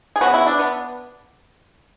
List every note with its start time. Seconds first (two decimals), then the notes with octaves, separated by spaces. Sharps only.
0.16 G#4
0.21 C#3 F#3 B3 F#4
0.34 E4
0.46 D4
0.59 B3